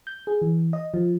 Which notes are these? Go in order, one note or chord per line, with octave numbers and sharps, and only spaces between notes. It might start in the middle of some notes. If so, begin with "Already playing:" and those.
G6
G#4
E3
D#5
F3